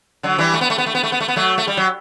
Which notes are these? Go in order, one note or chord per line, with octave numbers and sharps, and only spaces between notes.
D3 F#3
E3 G3
A3
B3
A3
B3
A3
B3
A3
B3
A3
B3
F#3 A3
A3
G3
F#3